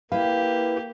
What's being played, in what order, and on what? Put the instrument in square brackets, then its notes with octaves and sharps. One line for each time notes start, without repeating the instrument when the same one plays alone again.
[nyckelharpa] A#3 G4 [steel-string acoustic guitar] E4 B4 [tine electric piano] F5